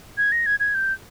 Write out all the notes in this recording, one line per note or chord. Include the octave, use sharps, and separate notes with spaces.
G#6
A#6
G#6
G#6
G6